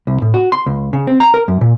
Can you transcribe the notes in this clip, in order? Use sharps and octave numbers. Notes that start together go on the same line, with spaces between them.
C2
A2
F#4
C6
C#2
C#3
C4
A#5
A#4
F#2
A#2